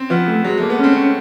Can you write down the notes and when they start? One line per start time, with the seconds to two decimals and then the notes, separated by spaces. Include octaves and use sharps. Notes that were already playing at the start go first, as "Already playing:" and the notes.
Already playing: C4 C#4
0.10 F3 B3
0.28 A3
0.44 F#3 G#3
0.57 A3
0.62 A#3
0.70 B3
0.79 C4 C#4
0.96 C#4